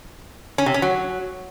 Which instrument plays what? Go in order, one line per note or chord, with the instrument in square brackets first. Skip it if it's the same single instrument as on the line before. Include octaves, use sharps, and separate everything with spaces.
[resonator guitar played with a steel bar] C#4
C3
C#4
F#3